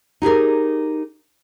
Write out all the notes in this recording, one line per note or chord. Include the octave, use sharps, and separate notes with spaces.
D#4 G4 G#4 A#4